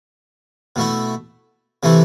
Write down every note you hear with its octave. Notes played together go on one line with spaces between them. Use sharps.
B2 A3 E4
C3 E3 A3 E4